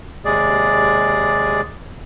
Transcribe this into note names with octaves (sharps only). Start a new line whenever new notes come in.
D#2 C3 G#3 G#4 D5